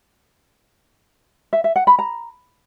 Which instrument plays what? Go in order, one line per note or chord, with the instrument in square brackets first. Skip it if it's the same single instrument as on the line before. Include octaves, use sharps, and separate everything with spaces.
[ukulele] E5
E5
F#5
B5
A#5